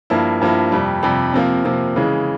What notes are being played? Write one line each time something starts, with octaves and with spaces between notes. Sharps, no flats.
G2 F3 A#3 E4
G2 F3 A#3 E4
F2 C3 G3
F2 C3 G3
C3 F3 A#3
C3 F3 A#3
C#3 E3 G#3